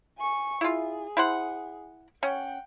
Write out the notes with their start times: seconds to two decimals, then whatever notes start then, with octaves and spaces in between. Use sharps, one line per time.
0.18 G#5 C#6
0.61 E4 F4 G#4
1.17 E4 C5 F#5
2.23 C#4 F#5 G5